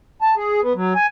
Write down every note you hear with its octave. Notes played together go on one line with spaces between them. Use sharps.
A5
G#4
B3
F#3
G#5